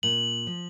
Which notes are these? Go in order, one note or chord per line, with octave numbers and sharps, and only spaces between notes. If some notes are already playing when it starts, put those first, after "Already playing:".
A#2 F#7
F3